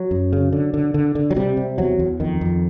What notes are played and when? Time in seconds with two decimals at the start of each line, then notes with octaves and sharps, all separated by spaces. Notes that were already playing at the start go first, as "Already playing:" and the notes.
Already playing: F#3
0.11 F#2
0.33 C#3
0.53 D3
0.74 D3
0.94 D3
1.15 D3
1.31 F#3
1.36 C3 G3
1.57 C3
1.78 E2 F#3
1.99 E2
2.20 F2 D#3
2.41 F2